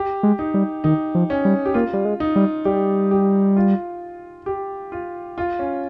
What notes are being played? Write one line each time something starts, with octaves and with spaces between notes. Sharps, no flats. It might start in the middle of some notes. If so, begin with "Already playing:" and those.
Already playing: G4
G#3
D#4
G3
D#3 D#4
F3
C#4
G3
G4
A#3 F4
G3
G#3
D#4
G3
G3 G4
G4
F4
G4
F4
F4
C#4